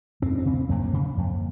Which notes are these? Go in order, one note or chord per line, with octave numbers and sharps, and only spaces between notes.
F2 C4
C4
C#3
C4
F2 A#3
C#3
F2